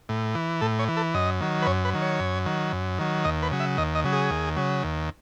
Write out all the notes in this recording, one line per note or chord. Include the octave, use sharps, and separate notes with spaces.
A2
E3
A2 A4
C#5
E3
A4
F#2 D#5
D#3 F#3
B4
F#2 C#5
B4
D#3 F#3
C#5
F#2
D#3 F#3
F#2
D#3 F#3
D#2 D#5
B4
C#3 F#3
E5
D#2 D#5
D#5
C#3 F#3
G#4
D#2
C#3 F#3
D#2